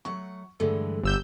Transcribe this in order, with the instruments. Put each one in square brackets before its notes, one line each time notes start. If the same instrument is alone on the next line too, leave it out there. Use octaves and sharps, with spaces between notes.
[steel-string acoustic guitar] F#3 A3 F#5 [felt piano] C#6
[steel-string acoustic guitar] G2 E3 G#3 [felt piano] D3 A3 [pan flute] A4
[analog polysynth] G1 E6 G6 [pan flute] G4